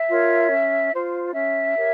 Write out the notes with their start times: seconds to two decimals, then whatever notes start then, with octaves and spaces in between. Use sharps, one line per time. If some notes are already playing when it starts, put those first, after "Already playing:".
Already playing: E5
0.09 F4 A#4 C#5
0.50 C#4
0.93 F4 C5
1.35 C#4 E5
1.76 G4 A#4 C#5